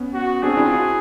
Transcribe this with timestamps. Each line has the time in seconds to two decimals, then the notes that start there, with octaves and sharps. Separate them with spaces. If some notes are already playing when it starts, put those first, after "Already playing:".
Already playing: B3 C#4
0.14 F#4
0.43 C4 D4 G#4
0.57 D4 E4
0.65 F4
0.71 E4 F#4